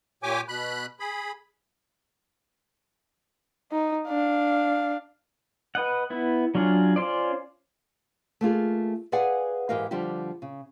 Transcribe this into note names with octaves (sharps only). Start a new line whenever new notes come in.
A#2 G4 C#5 G5 G#5 D6
B2 B5 F#6
G#4 B5
D#4
D4 F5
B4 D#5 F#5
B3 E4
F#3 C#4 D4 F4 G#4
C#4 F4 C5 D5
A3 A#3 F4 G#4
G#4 B4 D5 F5 F#5 G#5
G#2 E3 G4 A#4 D#5 F5
D3 F3 G3 D4 G4
C#3